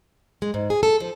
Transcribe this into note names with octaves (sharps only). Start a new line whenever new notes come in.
G#3
G#2
G#4
A4
F3